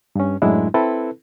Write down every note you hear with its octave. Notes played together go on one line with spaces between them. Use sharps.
G2 C#4
F#2 A2 F#3 G#3 D4 E4
C4 E4 A4 B4